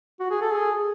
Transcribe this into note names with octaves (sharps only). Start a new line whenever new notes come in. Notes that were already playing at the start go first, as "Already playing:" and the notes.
F#4
G#4
A4
G#4